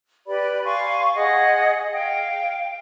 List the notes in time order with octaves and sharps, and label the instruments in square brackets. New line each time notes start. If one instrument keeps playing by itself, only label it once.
[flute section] G4 B4 D5 B5
F5 G#5 C6 C#6
G#4 D#5 F#5
F5 G5